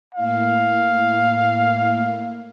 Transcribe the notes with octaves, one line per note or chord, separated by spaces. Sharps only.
A2 A#3 E4 F5